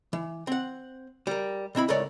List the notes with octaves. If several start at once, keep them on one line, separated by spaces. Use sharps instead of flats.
E3
C4 F#5
G3 A#4
B2 C4 E4 B5
C#2 G#2 A3 A#4 C#5 D5